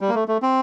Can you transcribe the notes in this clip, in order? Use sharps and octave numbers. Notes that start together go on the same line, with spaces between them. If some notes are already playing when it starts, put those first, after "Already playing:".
G3
A#3
A3
A3
C4